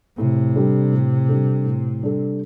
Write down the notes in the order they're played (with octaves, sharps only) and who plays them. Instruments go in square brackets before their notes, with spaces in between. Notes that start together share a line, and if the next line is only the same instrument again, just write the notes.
[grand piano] A2 [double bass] C3
[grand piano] G3 D4 A4
A2
G3 D4 A4
A2
G3 D4 A4